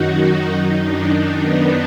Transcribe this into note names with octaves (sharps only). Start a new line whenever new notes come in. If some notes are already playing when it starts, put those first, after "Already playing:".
Already playing: F#2 D#3 D#4 F#4
D#4
F#2 D#3
D4
B3